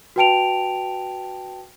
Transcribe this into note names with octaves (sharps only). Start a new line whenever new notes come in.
F#4 B4 G5 A5 D7 F7